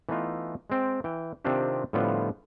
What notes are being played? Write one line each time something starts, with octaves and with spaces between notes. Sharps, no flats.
E3 A3 B3 D#4 F4
G#3 C4 G5
E3 G5
C3 D#3 C4 D4 F4 G4
A2 D3 F3 G3 B3 F4